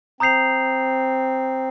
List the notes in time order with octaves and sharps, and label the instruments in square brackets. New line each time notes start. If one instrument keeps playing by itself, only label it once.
[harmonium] C4 [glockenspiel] A#5 D#6 G6 C7 F7